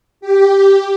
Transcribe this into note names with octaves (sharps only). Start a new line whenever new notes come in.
G4